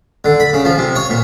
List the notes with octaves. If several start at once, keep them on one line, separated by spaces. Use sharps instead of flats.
D3
B5
C#3
F3
C3
C#5
A#2